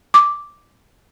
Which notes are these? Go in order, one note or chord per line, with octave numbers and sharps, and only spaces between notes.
D6